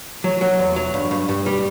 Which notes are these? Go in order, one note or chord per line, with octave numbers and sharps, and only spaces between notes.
F#3
F#3
E2
F#3
G2
G2
G2
G3